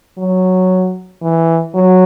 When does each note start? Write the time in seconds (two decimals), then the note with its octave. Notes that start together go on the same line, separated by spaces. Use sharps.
0.18 F#3
1.22 E3
1.74 F#3